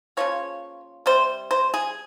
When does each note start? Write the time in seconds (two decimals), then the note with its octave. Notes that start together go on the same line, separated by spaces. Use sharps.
0.17 C#3 F3 A#3 C#5
1.06 C3 G3 C5
1.51 C5
1.74 G#4